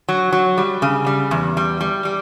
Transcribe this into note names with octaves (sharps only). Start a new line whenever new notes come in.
F#3
F#3
G3
C#3
G3
E2
G3
G3
G3